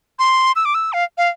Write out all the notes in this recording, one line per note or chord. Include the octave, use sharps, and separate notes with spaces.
C6
E6
D6
E6
F5
F5